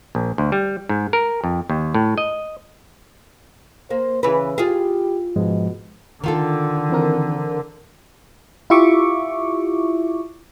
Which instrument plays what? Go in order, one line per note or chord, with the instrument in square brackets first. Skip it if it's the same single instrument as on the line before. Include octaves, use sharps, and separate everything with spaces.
[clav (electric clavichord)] A#1
D2
G3
G#2
A#4
F2
D#2
A2
D#5
[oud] A#3 [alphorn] C5
[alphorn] C#3 [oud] E3 B4
[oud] F4 G#4 [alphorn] G4
[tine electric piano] G#2 F3 G#3 [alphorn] B2
[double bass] D3 [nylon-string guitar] D#3 F4 A4
[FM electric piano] E3 C4 A#4
E4 F4 G4 E5 C#6 D6